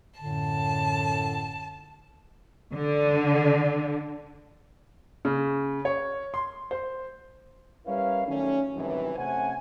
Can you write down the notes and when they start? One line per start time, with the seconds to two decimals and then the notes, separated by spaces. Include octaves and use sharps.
0.20 F#2 A2 D3 A5
2.74 D3
5.25 C#3
5.85 C#5
6.34 C6
6.71 C5
7.86 G3 C#4 E4 A#4 B4 F5
8.26 D#3 F#3 G3 A3 C#4
8.74 C2 F#2 A2 C3 D#3 E3
9.16 C3 A3 C#4 C5 F#5 G#5